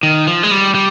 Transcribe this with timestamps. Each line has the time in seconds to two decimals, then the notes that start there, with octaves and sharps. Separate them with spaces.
0.03 D#3
0.27 F3
0.43 G#3
0.51 G3
0.75 G3